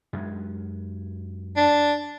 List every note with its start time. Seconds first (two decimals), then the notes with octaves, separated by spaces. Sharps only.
0.13 F#2 G#3
1.57 D4